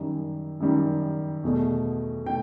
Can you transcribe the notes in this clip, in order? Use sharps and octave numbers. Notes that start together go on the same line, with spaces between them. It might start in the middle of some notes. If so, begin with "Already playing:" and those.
Already playing: F#2 D#3 G3
F#2 D#3 G3
E2 B2 A3
B2 A3 G5